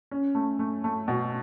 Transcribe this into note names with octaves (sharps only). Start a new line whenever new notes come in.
C#4
A3
A3
A3
B2